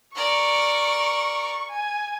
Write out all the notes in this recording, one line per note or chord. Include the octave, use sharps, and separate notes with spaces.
A#4 D5 C#6
G#5